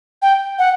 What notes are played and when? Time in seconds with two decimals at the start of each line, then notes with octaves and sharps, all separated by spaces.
0.22 G5
0.59 F#5